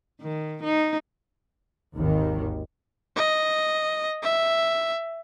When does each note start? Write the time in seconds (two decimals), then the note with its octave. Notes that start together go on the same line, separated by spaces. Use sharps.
0.21 D#3
0.64 D#4
1.97 G#1 D#2 D#3
3.16 D#5
4.22 E5